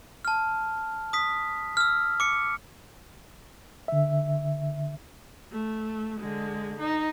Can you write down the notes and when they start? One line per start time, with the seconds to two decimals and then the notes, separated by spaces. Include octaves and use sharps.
0.25 A5 F6
1.13 D#6 B6
1.77 E6 F6
2.20 D6 C#7
3.88 D3 E5
5.52 A3
6.20 D3 G#3
6.79 D#4